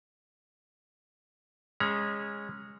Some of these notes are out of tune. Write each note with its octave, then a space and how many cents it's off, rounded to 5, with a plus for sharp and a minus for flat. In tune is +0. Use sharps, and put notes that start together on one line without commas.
G#3 -15 C#4 -10 A#5 +30